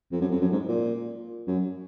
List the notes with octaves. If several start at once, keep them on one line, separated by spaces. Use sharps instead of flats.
F2
F#2
F2
F#2
G#2
A#2
F#2